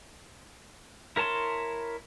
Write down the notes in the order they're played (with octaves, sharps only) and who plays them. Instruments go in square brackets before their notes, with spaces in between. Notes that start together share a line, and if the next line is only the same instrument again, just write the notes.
[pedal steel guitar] E4 A#4 C#5 A5 C6